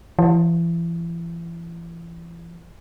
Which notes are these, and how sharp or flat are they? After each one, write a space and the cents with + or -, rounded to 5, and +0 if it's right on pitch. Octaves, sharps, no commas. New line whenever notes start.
E3 +35